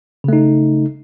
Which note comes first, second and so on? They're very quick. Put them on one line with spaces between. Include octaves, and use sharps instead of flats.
C#3 A3 D#4